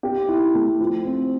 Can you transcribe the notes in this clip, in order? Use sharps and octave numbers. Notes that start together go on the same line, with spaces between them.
G4
E4
A3
F3
C4